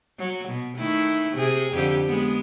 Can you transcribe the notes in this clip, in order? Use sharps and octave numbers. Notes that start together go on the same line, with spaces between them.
F#3
B2
D#3 A3 E4
C3 G#4
F2 D3 G4
G#3 B3